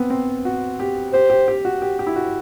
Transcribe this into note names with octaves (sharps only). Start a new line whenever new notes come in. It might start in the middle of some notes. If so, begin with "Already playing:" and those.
Already playing: B3 C4
C4
F#4
G4
G4 C5
G4
G4
F#4
G4
G4
E4
F#4